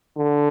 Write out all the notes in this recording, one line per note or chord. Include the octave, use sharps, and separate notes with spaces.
D3